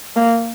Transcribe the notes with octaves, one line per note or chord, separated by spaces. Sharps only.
A#3